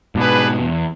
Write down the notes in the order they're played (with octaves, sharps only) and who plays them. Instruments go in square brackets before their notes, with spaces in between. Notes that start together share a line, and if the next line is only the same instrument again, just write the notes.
[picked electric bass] G#2 B2 [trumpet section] D4 G#4 B4
[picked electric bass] E2